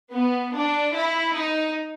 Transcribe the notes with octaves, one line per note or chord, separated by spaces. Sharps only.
B3
D4
E4
D#4